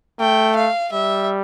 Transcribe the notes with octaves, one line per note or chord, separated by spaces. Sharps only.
A3 G5
F5
G3 E5